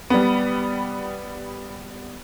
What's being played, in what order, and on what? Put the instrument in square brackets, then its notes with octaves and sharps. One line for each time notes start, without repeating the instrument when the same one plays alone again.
[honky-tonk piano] G3 B3